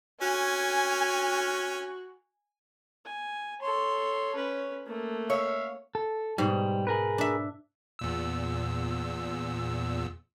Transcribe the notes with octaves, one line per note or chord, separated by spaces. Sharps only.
C#4 F#4 G#5
G#5
A4 C#5 C6
C#4 B4
A3 A#3
C#5 E5 F5
A4
G#2 B2 G3
G#4 A#4 B4
D4 E5
E2 A#2 E6